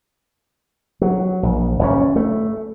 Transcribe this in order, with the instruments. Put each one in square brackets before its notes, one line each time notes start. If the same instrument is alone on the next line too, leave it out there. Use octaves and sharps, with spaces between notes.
[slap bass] F#3
A#1
F#1 G2 C#4
A3